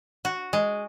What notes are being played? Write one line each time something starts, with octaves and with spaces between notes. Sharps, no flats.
F#4
G#3